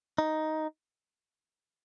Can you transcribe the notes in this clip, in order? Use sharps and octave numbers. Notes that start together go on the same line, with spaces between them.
D#4